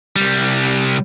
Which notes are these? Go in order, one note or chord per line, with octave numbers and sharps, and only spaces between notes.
C2 G3